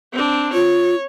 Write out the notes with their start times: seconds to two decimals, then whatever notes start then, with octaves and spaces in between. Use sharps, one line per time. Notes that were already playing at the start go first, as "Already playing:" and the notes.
0.13 C4 D4
0.53 F4 C#5